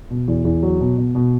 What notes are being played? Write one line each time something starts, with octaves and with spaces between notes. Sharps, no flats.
B2
E2
E2
F#3
B2
B2
B2